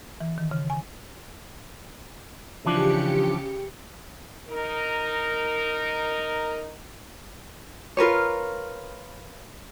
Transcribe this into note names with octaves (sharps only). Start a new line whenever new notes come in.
E3
D#3
C#3
G#5
C#3 E3 F3 D4 G4 C#7
D#4 A#4
F4 A#4 B4 C#5